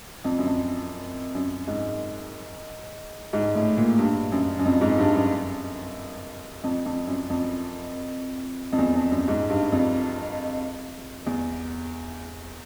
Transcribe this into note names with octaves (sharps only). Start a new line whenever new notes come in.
F2
F#2
F2
F#2
G#2
G#2
A2
A#2
G2
F#2
F#2
F2
G#2
G2
F#2
F2
F2
F#2
F2
F2
E2
F2
F#2
G#2
G2
F2
E2